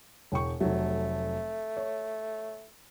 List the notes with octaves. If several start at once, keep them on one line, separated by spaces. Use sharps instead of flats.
E1 G5 C#6
F1 F#3 A3
C#5